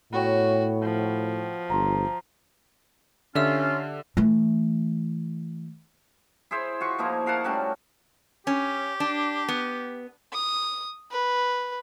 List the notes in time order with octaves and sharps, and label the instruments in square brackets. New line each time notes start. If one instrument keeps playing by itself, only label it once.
[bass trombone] A2 [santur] B3 C#5 G5 [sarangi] F#4
[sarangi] F3
[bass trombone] G1 [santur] C5 A#5
[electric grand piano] D3 [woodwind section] C#4 F4 [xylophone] G4 E5 E6
[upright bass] E3 A3
[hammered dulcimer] E4 G#4 C5 E5
F4 F#4 C#6
F3 A#3 D#4 E4
A#4 F5 F#5 A5
G3 A3 C#4 F#4
[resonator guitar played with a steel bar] C#4 [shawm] G4
[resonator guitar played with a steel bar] D4
B3
[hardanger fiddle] D#6
B4